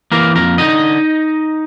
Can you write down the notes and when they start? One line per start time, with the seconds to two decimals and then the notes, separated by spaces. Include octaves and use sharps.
0.12 E3 A#3 A#4
0.35 F2 A#3 A#4
0.58 D3 D#4 D#5